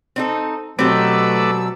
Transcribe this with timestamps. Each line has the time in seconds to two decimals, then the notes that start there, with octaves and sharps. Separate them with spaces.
0.16 C4 D#4 A4
0.79 B2 F#3 A3 C4 G4 B4 D5 E6